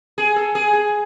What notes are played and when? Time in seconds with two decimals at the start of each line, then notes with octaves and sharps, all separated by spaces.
0.18 G#4
0.36 A4
0.55 G#4
0.73 G#4